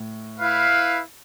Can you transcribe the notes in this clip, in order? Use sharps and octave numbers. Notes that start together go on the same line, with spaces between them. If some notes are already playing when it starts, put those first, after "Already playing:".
Already playing: A2
E4 B4 F5